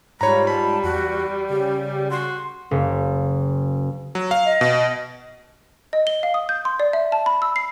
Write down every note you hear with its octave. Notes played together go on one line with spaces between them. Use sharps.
G#2 G3 F4 C#5 A#5 B5
A5 B5
E2 F#4
C#3 G4
F#4 C6
F#1
F#3
F5
D#5
B2
D#5
G7
F5
D#6
G6
C6
D5
E5
A5
B5
E6
C7